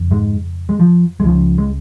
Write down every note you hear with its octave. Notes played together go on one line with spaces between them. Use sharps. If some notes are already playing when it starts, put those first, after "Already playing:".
Already playing: F2 C#3
G#2 G#3
G#3
F3
G#3
C#2 C#3 F3
G#3